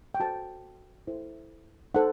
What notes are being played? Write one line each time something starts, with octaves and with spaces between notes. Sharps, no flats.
G5
F#4 A4 C5 A5
E4 A4 C5
D#4 A4 C5 F#5